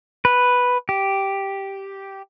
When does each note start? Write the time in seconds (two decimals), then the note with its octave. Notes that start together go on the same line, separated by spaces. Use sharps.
0.25 B4
0.89 G4